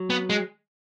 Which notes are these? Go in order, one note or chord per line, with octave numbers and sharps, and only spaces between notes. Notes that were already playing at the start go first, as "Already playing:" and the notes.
Already playing: F#3
B3
G#3